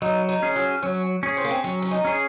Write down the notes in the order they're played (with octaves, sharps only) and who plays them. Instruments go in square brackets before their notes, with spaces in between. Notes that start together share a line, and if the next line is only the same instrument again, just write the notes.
[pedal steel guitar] F#3 [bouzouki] D#4
[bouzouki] D#4
[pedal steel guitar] C#4 G#4
[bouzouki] F#3
[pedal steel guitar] F#3 [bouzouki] C#4
[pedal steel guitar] C#4 G#4
[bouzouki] C4
A#3
C4
[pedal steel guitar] F#3 [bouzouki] C#4
[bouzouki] C#4
D#4
[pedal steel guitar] C#4 G#4